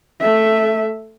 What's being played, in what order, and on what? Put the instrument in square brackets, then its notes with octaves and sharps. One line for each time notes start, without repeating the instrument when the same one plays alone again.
[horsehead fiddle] A3 E5